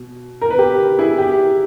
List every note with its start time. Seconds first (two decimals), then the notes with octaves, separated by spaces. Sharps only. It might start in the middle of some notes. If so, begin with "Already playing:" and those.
Already playing: B2
0.41 A#4
0.50 B4
0.58 G4 A#4
0.99 E4 G#4
1.18 G4